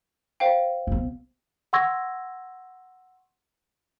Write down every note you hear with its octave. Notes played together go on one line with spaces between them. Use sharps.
C5 F5 G5
B1 B3
F#5 C6 C#6 E6 G#6 A#6